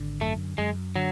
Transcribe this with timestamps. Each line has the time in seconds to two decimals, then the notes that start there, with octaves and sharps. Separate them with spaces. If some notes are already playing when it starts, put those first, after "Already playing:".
Already playing: G#1 D3
0.21 F#2 A3
0.58 F#2 G#3
0.96 D3 F#3